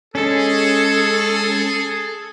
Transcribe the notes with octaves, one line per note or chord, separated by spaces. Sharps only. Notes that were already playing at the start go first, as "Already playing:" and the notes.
G#3 C#4 G#4 A4